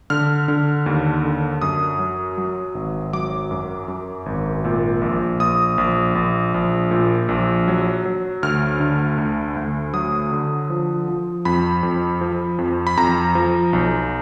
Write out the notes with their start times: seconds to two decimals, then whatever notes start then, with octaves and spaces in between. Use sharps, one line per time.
0.10 D3 F6
0.48 D3
0.86 D#2
1.24 D3
1.62 F#2 D#6
1.99 F#3
2.38 F#3
2.75 G#1
3.13 F#3 D6
3.51 F#2
3.88 F#2
4.26 G#1
4.64 A#2
5.01 A#1
5.39 A#1 D#6
5.78 A#1
6.15 A#1
6.54 A#1
6.91 A#2
7.29 A#1
7.68 F#3
8.06 F#3
8.43 D2 F6
8.80 D3
9.18 D2
9.56 D2
9.94 F#3 D#6
10.32 D3
10.70 F3
11.08 F3
11.45 F2 B5
11.83 F2
12.21 F3
12.59 F2
12.87 B5
12.97 F2 A#5
13.35 F3
13.73 B1